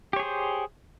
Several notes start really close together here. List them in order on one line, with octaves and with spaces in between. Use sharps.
G4 C#5 G#4 C5